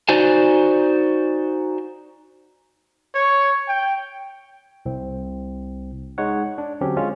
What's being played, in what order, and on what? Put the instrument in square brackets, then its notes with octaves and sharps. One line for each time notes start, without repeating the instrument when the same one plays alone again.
[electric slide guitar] D#4 F#4 C5 D5 G#5
[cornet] C#5
G5
[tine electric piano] C2 C4
G#3 D#4 C#5 F#5
D4
D3 F#3 C4 C#4 G4
G#3 C#4 F4